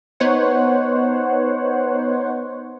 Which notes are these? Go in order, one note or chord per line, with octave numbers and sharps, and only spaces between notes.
B3 D#4 C5 C#5 F#5